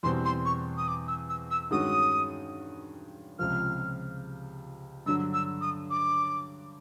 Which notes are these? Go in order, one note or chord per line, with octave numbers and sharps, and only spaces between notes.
E2 B2 G3 C4 C6
C6
C#6
D#6
D6
E6
E6
E6
G2 D#3 G#3 C#4 F#4 D#6
C#2 C3 F3 F6
G2 D3 F#3 E6
E6
D#6
D6